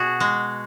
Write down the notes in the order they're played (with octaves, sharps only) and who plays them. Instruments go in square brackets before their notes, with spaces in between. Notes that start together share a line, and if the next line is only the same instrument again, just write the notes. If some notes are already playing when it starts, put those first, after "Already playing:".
Already playing: [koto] B2 F#4 G#4
G#3